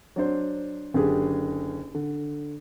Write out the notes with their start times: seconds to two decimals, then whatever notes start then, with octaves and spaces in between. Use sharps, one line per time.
0.16 F#3 D4 C5
0.94 F#1 D3 G4 G#4
1.94 D3